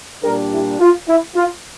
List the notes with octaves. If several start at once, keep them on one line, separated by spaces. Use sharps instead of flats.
A#2 G3 D4 G4 A#4
E4 G4
F4
E4
F4